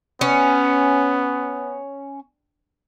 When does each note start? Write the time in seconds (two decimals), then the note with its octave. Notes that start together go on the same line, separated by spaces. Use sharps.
0.21 B3 C#4